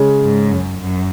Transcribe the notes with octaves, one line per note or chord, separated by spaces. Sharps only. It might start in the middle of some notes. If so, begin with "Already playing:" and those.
Already playing: C#3 G#3 C#4
G#2
F#2
F#2